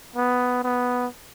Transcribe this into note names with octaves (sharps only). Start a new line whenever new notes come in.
B3
B3